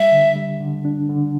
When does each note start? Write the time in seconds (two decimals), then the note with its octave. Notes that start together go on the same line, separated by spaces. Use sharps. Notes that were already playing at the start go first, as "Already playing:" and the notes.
Already playing: G3 E5
0.12 D3
0.36 G3
0.60 D3
0.85 D4
1.09 D3